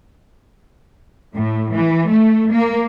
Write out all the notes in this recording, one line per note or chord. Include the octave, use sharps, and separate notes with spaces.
A2
E3
A3
A#3